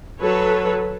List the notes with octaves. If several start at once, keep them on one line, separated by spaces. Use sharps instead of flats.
F#3 A4 B4 C#5